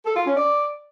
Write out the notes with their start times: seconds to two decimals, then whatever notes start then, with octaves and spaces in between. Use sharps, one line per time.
0.06 A4
0.16 F4
0.26 C#4
0.36 D5